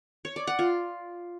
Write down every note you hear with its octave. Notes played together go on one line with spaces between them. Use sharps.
C#5
D5
F#5
F4